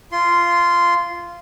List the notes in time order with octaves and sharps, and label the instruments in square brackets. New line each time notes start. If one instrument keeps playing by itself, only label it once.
[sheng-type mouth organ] F4 C6